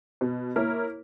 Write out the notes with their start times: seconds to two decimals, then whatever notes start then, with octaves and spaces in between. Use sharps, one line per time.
0.21 B2
0.56 A#3 E4 A#4 C#5